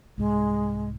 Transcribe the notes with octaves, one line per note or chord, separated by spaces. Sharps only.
C2 G#2 G#3